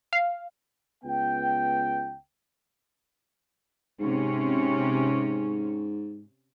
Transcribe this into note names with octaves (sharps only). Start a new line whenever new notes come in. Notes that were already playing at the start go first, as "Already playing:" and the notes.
F5
C#2 B3 G5
G#2 C3 C#4